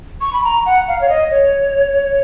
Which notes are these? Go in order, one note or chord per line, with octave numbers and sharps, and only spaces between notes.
C#6
B5
A#5
F#5
F5
C#5
D#5
C#5